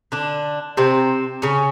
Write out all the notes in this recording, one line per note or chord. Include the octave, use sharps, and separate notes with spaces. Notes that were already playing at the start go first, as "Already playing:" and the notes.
D3 D4
C3 C4
C#3 C#4